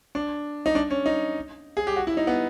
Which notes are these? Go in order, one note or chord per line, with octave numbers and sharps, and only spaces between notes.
D4
D#4
D4
C#4
D#4
G#4
G4
F#4
E4
D#4
B3